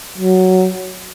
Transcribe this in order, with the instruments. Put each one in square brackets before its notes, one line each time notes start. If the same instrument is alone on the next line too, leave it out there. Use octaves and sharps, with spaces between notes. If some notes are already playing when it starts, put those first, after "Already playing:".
[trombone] F#3